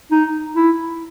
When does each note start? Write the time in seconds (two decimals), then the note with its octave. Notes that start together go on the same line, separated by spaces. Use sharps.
0.12 D#4
0.56 E4